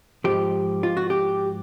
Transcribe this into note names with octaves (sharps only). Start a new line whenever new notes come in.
G#2 F3 G4
F4
F#4
G4